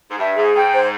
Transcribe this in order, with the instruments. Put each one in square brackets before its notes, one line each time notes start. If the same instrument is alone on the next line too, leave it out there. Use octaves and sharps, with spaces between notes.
[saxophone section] G#2
[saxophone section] G2 [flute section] E5
[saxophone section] G#2 [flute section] G#4
[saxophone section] G#2 [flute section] G5
[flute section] C5